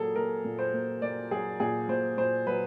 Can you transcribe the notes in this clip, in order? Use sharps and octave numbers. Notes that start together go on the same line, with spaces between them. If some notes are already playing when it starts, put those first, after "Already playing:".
Already playing: A#2 F#3 A#3 G#4 A4
A#3 A#4
A#2
C5
A#3
A#3 D5
F#3 G#4
A#2 G#4
A#2 C5
A#2 C5
F#3 B4